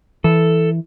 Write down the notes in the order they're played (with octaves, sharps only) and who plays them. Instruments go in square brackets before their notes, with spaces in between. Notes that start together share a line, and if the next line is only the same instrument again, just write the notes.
[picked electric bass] E3 [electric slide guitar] A4